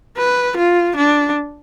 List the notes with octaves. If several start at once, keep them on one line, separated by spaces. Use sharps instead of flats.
B4
F4
D4